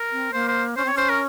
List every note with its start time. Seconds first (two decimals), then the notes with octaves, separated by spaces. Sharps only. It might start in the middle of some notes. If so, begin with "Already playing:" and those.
Already playing: A#4
0.12 C4
0.33 A#3 C5
0.48 C5
0.76 C#4 C5
0.85 C4 C#5
0.94 C#4 C5
1.09 A#4